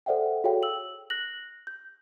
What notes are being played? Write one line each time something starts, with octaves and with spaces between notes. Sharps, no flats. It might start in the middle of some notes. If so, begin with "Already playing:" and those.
A4 C5 D5 E5 F#5 G5
F#4 G#4 A4 C#5 F5 G5
E6 F#7
F#6 A#6 F#7
G6